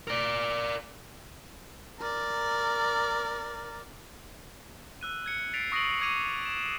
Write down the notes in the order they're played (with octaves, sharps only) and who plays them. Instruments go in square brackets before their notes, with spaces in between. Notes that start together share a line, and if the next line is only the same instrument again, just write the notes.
[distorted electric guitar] A#4 D5
[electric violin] A#4 D5
[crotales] E6 F#6 D#7
F#6 G#6 C#7
A6 B6 C7 D7 F7
C#6 D#6 A#6 C7 D7 F#7
C#6 D6 G#6 C7 D#7 F7
E7